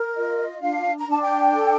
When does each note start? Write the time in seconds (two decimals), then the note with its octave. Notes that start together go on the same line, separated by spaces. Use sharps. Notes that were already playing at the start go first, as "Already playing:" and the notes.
Already playing: A#4
0.14 F4 D#5
0.60 D4 F5
0.98 A#5
1.06 D4 A5
1.21 G5
1.51 A4